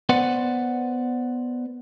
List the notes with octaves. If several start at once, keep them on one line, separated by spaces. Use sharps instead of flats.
B3 B4 C5 D5 F#5